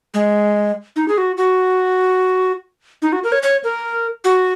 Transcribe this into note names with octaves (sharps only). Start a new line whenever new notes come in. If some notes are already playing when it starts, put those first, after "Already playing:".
G#3
D#4
G#4
F#4
F#4
D#4
F#4
A#4
C#5
C#5
A#4
F#4